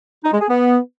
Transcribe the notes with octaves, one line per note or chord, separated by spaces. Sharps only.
D#4
G#3
G#4
B3